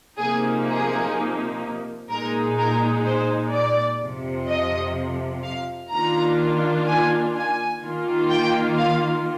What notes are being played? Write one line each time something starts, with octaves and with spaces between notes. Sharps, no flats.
C3 F3 A#3 D#4 G#4
G#4
A#2 G#3 D#4 A#4
A#4
C5
D5
F2 C3 F3
D#5
F5
D#3 A#3 D4 F4 A#5
G#5
G#5
D#3 A#3 F4
G5
F5